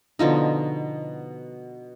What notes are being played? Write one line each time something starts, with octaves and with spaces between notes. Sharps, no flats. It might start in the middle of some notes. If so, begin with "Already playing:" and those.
B2 D3 F3 D#4